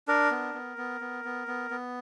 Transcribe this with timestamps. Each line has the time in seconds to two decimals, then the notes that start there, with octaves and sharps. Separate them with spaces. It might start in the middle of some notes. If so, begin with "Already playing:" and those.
0.08 D4 A#4
0.31 B3
0.54 B3
0.78 B3
1.01 B3
1.25 B3
1.48 B3
1.71 B3